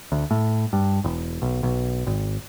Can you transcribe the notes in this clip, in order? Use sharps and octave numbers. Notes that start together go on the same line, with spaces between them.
D2
A2
G2
E1
B1
B1
G#1